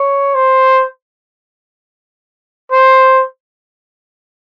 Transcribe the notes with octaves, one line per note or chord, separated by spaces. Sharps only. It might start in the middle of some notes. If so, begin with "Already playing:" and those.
Already playing: C#5
C5
C5